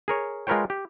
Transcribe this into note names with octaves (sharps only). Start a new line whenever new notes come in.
G#4 A#4 C#5
G#3 F4 A#4 B4 C#5 G5
G4